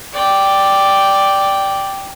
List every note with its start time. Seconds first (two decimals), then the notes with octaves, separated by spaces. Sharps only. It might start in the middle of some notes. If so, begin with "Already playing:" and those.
0.13 D5 G5